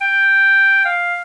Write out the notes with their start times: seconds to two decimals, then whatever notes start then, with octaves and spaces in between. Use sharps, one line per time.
0.01 G5
0.85 F5